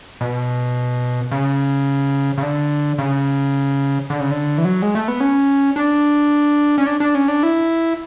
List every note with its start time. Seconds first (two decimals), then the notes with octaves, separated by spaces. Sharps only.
0.21 B2
1.32 C#3
2.38 C#3
2.43 D3
2.98 C#3
4.10 D3
4.20 C#3
4.31 D3
4.58 E3
4.65 F#3
4.82 G#3
4.95 A3
5.08 B3
5.20 C#4
5.76 D4
6.78 C#4
6.86 D4
7.00 D4
7.15 C#4
7.28 D4
7.43 E4